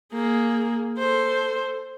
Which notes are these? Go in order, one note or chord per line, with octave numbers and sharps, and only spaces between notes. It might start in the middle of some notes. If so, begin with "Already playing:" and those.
A#3 G#4
A4 C5